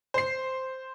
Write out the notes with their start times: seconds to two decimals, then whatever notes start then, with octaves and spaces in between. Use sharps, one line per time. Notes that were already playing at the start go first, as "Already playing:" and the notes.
0.14 C5 C7